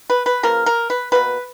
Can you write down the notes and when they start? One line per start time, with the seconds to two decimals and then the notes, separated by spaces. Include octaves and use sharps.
0.10 B4
0.26 B4
0.43 C#3 F3 A#3 A#4
0.66 A#4
0.90 B4
1.12 B2 F#3 A#3 B4